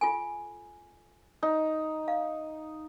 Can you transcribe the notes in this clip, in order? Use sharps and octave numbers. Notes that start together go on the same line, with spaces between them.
F4 A4 G#5
D#4
F5